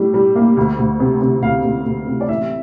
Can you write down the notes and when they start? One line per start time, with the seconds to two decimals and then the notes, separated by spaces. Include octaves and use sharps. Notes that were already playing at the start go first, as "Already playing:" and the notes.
Already playing: A2 G3
0.14 G3
0.36 A#3
0.57 D2
0.79 D2
1.00 C3
1.21 C3
1.42 D2 F5
1.64 D2
1.86 D2
2.07 C3
2.21 D5
2.29 A1 E5